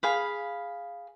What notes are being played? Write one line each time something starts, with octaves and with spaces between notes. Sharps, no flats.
G#4 F5 B5